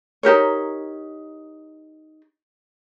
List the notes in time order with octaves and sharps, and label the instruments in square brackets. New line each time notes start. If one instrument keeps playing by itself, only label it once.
[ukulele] D#4 G4 A#4 C#5